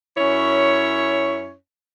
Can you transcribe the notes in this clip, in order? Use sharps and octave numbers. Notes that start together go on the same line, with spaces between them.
F#2 C#4 E4 C#5